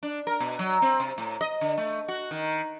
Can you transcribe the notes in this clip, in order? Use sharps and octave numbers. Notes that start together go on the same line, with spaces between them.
D4
A#4
B2
F#3
C4
C3
A2
D#5
D3
A3
F#4
D#3